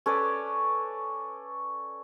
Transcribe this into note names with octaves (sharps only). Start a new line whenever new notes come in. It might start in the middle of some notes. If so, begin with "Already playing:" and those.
C#4 A4 B4 D5